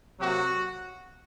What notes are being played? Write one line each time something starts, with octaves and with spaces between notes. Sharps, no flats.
C3 F#3 A#3 F#4